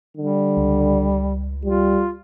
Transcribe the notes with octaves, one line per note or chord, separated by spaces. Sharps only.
D3 G3
C#2
G3 F4